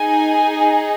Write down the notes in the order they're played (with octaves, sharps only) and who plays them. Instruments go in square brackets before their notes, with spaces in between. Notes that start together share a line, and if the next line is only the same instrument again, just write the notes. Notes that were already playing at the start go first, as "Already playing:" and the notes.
Already playing: [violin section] D#4 G#4 G#5